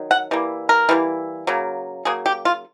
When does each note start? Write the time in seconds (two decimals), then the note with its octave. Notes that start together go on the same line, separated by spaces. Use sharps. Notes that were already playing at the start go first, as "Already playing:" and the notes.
Already playing: D#3 F#3
0.11 F#5
0.31 E3 G3 A#3
0.69 A#4
0.89 E3 G3 A#3
1.47 C#3 F#3 A#3
2.05 C#3 F#3 A#3 G#4
2.26 G4
2.45 F4